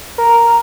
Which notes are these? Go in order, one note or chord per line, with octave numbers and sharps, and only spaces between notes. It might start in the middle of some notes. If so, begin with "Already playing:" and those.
A#4